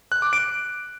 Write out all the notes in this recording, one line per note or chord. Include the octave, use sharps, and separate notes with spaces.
F#6
D6
D7